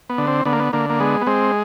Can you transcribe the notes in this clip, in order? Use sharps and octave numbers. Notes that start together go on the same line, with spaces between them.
B3
D3
C4
D3 B3
A#3
B3
D3 A#3
A#3
G#3 B3
B3
G#3 C4